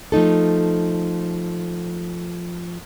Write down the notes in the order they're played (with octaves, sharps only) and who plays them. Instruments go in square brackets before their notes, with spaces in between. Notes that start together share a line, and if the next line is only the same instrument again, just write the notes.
[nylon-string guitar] F3 A3 D#4 A4